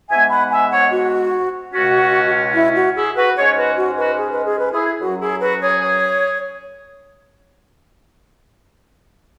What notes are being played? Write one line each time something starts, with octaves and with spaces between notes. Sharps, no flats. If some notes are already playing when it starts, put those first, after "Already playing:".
G#2 G#3 B3 E5 G#5
F#5 B5
E5 G#5
C#5 F#5
F#4
C#2 B2 G#3 C#4 F#4
E4
F#4
E4 G#4
F#4 B4
G#2 G#3 C#4 G#4 C#5
F#4 B4
F#4
F#4 B4
G#4
B4
G#4
B4
E4 G#4
F#2 F#3 C#4 F#4
E4 G#4
F#4 B4
G#4 C#5
G#4 C#5